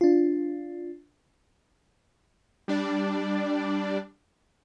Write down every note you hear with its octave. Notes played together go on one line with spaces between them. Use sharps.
D4 F4
G3 D4 D5